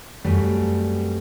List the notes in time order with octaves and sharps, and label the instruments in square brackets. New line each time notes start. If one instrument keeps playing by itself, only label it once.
[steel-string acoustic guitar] F#2 G3 A3 C4 B4 G#5